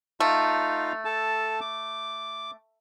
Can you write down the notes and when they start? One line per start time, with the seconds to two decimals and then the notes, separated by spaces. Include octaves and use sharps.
0.20 A3 D#4 F4 F5
1.05 A4 A5
1.61 D6